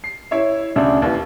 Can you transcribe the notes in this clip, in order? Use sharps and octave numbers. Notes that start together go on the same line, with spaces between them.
C7
E4 C#5 E5
D2 C#3 D4 E5
D#2 E3